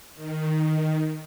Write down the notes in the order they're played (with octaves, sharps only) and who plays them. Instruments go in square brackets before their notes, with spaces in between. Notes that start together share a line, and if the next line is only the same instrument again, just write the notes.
[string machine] D#3